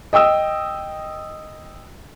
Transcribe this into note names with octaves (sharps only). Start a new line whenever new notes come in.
D#5 G5 D#6 E6